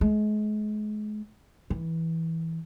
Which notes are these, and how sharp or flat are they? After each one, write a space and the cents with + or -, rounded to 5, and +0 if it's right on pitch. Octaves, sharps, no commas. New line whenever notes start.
G#3 +35
E3 -15